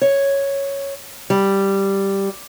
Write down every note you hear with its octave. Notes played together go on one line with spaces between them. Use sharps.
C#5
G3